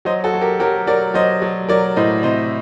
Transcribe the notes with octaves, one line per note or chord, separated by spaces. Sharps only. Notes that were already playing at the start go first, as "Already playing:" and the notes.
F#3 C5 D#5
F#4 A4
F#3
G4 A#4
F#3 G4 A#4
F#3 A#4 D5
F#3 C5 D#5
F#3
F#3 A#4 D5
A2 C5 D#5
C3 C5 D#5